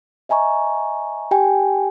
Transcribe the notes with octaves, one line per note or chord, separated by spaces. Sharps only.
D#5 E5 G#5 A#5 C#6
G4 G5 G#5